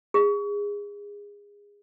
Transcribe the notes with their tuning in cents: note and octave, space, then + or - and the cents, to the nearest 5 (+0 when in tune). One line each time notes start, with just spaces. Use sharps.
G#4 -25